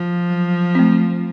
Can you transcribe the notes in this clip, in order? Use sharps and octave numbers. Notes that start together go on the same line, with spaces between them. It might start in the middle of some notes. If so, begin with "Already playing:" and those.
Already playing: F3
F#3
A3 C4